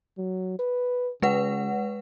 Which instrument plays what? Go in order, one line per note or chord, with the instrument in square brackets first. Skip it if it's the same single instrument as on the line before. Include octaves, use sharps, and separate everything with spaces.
[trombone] F#3
B4
[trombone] C#3 [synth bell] G#3 B4 F#5